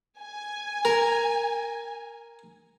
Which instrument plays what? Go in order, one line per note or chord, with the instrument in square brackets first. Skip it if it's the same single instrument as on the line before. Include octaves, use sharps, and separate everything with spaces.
[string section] G#5
[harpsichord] A#4